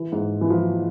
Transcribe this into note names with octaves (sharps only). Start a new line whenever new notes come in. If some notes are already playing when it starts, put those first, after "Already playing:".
Already playing: E3
G#2
E3
F3